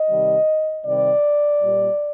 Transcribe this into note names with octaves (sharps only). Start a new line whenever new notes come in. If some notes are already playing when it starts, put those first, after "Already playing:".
Already playing: D#5
C3 D#3 G3
C3 D#3 G3 D5
A#2 G3